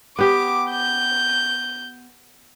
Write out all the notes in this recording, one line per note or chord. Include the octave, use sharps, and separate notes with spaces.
B3 G4 D6
G6